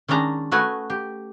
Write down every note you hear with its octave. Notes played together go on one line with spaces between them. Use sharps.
D#3 G#3 C#4 D4 A#5
A3 F#4 B4 D#5 G#5
G4